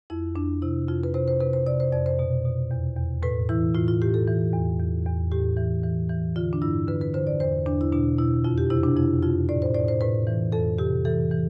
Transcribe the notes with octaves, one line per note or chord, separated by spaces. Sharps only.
F2 E4
F2 D4
C3 E4
F2 F4
B4
C3 C5
C5
C3 B4
C5
C3 D5
C5
F2 D5
C5
B2
B2
E2
E2
A2 B4
E3 E4
A2 F4
F4
A2 G4
A4
E3
E2
E2
E2
A2 G4
E3
E3
E3
D3 F4
D4
G2 E4
D3 B4
B4
D3 C5
D5
E2 C5
E2 D4
E4
B2 D4
B2 E4
F2 F4
G4
C3 E4
D4
F2 E4
F2 F4
A2 D5
C5
A2 D5
C5
A2 B4
E3
F2 A4
C3 G4
E3 A4
E3